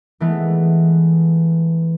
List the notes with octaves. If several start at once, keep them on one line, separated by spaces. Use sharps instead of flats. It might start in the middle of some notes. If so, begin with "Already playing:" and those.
E3 G#3 A3 B3